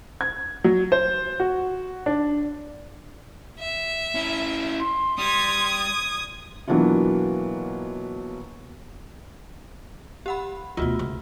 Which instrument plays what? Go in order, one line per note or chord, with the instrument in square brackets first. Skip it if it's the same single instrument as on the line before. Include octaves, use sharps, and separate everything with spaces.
[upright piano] G#6
F#3
C5
F#4
D4
[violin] E5
[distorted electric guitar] C#4 E4
[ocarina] C6
[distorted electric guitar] G3 [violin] D#6 G#6
[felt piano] B2 E3 F#3 A#3 D4 F4
[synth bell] G4 F#5 B5
[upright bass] D2 B2 [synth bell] F4 F#4
[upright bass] C#2